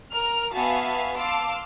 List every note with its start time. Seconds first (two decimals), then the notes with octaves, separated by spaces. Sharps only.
0.13 A#4 F6
0.54 B3 F#4 E5 F5 G#5 A5
1.18 F5 A5 C6 D6 E6